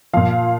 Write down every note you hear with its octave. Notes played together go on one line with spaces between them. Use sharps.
A#2 F3 F5